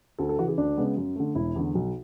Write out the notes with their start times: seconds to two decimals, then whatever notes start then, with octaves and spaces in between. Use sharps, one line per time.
0.18 D2 A4
0.29 A4
0.38 E3 F#4
0.43 C#3
0.48 G#4
0.58 D2 D4
0.77 C#3 G#3 B3
0.97 F#2
1.16 D3 A3
1.35 E1 E4
1.55 E2 D3
1.75 B1